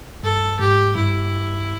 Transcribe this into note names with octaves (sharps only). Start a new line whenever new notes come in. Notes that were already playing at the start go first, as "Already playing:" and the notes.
G2 A4
G#2 G4
G2 E4